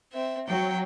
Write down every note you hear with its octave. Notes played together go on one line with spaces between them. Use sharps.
C4 E5
F#3 G5